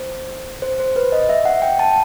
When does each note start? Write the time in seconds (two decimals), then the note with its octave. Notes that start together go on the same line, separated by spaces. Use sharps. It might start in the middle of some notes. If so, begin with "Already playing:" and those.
Already playing: C5
0.62 C5
0.80 C5
0.96 B4
1.12 D#5
1.29 E5
1.45 F#5
1.62 G5
1.79 A5